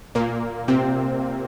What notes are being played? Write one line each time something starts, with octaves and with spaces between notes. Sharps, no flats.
A#2 A#3
C3 C4